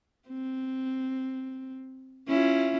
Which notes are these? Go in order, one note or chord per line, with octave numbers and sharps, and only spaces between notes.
C4
C#4 E4 F4